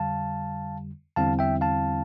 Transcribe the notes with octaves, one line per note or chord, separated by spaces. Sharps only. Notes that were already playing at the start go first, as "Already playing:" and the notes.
Already playing: F2 D3 G3 F5 A5
E2 D3 G3 C4 E4 F5 A5
E5 G5
F5 A5